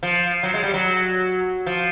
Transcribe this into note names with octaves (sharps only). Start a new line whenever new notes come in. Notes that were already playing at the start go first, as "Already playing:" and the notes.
F3
F#3
G#3
G3
F#3
F3